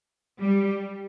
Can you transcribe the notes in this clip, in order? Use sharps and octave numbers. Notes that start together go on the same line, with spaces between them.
G3